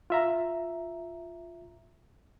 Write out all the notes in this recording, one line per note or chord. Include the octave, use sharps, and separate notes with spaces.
F4 E5 A#5